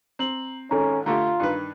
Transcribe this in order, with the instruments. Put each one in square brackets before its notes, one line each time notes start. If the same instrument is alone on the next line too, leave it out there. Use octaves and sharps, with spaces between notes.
[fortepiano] C4 [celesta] A#5 F#7
[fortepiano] G#1 G#2 [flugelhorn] C#4 [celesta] A4 A#5
[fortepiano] D3 A3 G4 [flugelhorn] F4 [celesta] A#5
[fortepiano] G2 D#3 B4